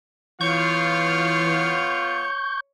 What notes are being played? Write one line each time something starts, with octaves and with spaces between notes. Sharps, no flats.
E3 B3 F4 C#5 C#6 G6